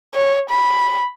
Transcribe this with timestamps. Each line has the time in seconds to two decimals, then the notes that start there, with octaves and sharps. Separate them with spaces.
0.14 C#5
0.50 B5